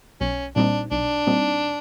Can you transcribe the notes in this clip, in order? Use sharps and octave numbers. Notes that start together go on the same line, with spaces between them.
B1 C#4
A#2 G3 C4 D4 D#4
B1 D4
A#2 G3 C4 D#4